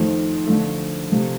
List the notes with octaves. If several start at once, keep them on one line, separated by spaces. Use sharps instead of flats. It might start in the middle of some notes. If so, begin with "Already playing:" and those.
Already playing: F2 D#3 A3
D3 F3 A3
C3 F3 A3